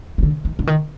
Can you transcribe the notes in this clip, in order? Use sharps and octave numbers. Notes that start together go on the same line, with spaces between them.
D#3
D3
D#3
D3
D#3